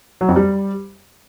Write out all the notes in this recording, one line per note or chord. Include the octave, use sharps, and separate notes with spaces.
F#3
F2
G3